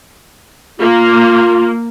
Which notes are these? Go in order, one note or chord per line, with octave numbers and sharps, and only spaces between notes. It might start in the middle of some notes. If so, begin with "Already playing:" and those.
A#3 F4